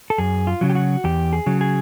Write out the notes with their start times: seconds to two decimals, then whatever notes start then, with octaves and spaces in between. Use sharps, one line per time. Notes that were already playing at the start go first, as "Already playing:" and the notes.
0.10 A4
0.18 F#2 G#4
0.47 F4
0.61 C#3 F#3
0.69 G4
0.75 F#4
1.04 E2 G4
1.33 G#4
1.46 C#3 F#3
1.61 G#4